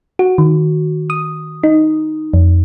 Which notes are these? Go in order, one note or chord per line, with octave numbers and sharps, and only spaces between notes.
F#4
D#3
D#6
D#4
F2